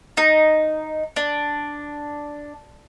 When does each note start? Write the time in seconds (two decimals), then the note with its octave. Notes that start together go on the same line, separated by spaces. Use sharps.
0.17 D#4
1.16 D4